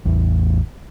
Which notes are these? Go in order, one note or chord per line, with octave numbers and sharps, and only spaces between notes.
A1 E2